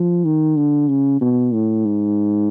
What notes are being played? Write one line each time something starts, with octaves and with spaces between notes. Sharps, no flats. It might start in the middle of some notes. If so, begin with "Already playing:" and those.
Already playing: F3
D#3
D3
C#3
B2
A2
G#2